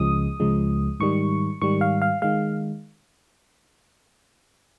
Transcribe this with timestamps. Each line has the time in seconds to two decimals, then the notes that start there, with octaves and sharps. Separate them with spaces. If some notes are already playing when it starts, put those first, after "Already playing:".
Already playing: C#2 C#3 F3 G#3 D#6
0.40 C#2 C#3 F3 G#3
1.00 G#2 D#3 G3 C#6
1.62 G#2 D#3 G3 C#6
1.81 F5
2.02 F5
2.22 D#3 G#3 F5